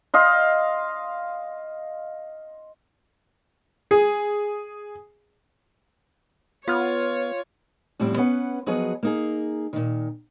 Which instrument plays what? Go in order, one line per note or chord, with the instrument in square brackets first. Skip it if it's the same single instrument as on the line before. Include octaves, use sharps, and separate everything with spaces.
[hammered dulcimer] D#5 F5 C6
[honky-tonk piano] G#4
[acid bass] B3 [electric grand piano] F4 F6 [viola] C#5
[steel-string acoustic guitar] E2 A2 F3 G3 C4 E4
B3 C#4 B4 F#5
F3 F#3 B3 F#4 G#4 D#5
A#3 D#4 G#4
A#2 D#3